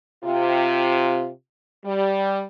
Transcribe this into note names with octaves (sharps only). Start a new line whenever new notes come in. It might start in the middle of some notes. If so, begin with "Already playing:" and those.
C3 F4
G3